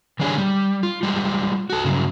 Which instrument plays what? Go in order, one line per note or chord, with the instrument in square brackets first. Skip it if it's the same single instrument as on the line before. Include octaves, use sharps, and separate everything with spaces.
[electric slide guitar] D#3 G3 D4 G#4 C#5 D5
G3
F4
G3 G#3 F4
F#4 A4
G2 C#3 F#3